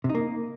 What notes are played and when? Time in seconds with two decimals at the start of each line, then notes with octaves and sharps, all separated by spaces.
0.04 C3
0.09 D#4
0.15 A#3